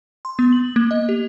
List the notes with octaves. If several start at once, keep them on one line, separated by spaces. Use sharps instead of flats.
C6
B3
F#7
A#3
D#5
G4